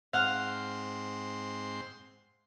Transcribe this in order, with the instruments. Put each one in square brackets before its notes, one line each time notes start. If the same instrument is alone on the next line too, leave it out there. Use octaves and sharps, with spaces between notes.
[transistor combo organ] G#2 C4 C6 [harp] F5 F#5 F6